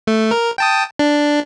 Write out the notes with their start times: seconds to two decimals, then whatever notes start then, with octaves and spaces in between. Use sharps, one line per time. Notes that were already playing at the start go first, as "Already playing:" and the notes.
0.07 A3
0.31 A#4
0.58 G5 A5 D#6
0.99 D4